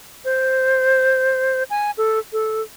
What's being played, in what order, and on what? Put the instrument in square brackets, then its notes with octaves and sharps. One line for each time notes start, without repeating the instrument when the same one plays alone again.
[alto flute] C5
G#5
A4
A4